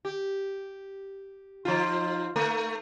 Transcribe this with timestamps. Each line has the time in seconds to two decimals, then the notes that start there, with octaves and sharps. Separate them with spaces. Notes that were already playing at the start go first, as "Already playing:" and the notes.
0.05 G4
1.65 F3 D#4 F4
2.36 A3